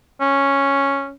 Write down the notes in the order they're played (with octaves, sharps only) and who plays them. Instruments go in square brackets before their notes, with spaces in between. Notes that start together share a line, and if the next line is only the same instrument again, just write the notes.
[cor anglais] C#4